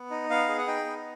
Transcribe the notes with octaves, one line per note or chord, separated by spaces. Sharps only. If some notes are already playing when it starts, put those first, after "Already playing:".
Already playing: B3
D#4
B3 F5
G#4
F#5
D#4 G5
B3